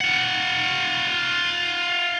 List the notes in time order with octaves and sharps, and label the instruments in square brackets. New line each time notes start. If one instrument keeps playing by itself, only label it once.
[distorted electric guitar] F4 F#5